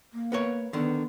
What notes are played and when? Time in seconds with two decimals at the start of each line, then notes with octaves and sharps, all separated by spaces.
0.13 A#3
0.32 B3 A#4 C#5
0.73 D3 D#3 B3